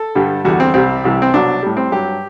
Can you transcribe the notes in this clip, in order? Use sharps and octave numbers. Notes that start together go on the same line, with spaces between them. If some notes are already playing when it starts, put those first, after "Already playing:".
Already playing: A4
G2 D3 G3
E2 D3 G3 F#4
C4
C2 C3 G3 C4
C2 C3 E3 G3
C4
C2 B2 F#3 D4
A2 G3
C4
G2 F#3 G4